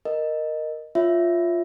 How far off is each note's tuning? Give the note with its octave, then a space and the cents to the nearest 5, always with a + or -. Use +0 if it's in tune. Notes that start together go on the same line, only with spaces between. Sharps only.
A#4 +0 D#5 -10
F4 +0 C#5 +5 E5 +0